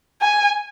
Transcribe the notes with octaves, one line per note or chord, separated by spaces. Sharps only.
G#5